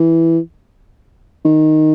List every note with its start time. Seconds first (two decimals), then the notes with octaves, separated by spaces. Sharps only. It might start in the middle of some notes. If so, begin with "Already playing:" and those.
Already playing: E3
1.45 D#3